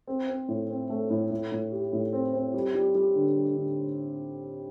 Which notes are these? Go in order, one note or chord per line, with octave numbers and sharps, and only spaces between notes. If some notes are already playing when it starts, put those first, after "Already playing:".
C4
C4
A2
C4
A3
A2
A2
A2
G4
A2
C4
C4
G3
G3
G3
D3
G3
D3